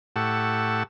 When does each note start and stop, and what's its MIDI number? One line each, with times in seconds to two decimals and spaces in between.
0.16 0.83 45
0.16 0.83 67
0.16 0.83 78
0.16 0.83 81
0.16 0.83 85
0.16 0.83 88